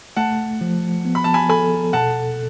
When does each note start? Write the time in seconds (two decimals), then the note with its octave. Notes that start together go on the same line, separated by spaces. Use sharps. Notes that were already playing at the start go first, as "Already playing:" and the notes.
0.17 A3 F#5 A5
0.61 F3
1.05 B3
1.15 B5
1.24 A5
1.34 G#5 B5
1.49 A4 G#5 B5
1.93 B2 F#5 A5